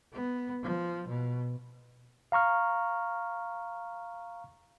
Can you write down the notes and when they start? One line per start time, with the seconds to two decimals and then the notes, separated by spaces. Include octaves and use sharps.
0.12 B3
0.63 F3
1.07 B2
2.32 F5 A#5 C#6 F6